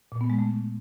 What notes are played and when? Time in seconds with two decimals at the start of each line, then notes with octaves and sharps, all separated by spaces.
0.12 A#2
0.21 B3
0.30 G#3
0.39 A3